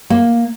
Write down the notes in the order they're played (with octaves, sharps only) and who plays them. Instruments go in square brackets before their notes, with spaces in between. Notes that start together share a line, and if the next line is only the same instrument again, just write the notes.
[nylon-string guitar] A#3